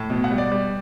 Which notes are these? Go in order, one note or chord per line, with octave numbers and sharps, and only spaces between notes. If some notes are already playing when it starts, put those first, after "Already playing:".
Already playing: A2
B2
F#5
G3
D5
G3